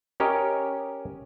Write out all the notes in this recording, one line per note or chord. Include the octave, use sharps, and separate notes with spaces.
C#4 G4 A#4 C#5 D#5